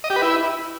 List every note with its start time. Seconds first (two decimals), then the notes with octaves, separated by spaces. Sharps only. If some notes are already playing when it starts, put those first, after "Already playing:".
0.04 D#5
0.10 G4
0.16 B4
0.22 E4